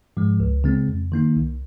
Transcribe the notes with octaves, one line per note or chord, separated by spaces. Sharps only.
G#2 F3 G#3
C#2
C#3 G#3 C4
F2
D#3 A#3 D#4
C2